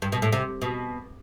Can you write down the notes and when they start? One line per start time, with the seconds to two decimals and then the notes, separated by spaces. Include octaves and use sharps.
0.02 G2
0.12 B2
0.22 A2
0.32 C3
0.62 B2